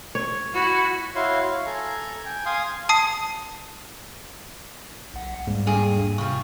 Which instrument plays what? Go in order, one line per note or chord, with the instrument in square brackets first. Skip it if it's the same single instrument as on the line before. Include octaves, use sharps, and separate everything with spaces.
[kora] C#5
[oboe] E4 [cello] F#4
[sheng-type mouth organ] E4 F#4 C#5 F5 C6
C#5 F5
A4 G#5 A#5
G5 G#5
F5 G#5 C6 D#6
[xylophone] A5 D#6 C7
[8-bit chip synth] B1 F#5
[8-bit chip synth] E2 G3 A#3 [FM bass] G#2
[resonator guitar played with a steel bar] G2 G#4
[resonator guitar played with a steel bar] G2 F3 [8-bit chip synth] C3 C#6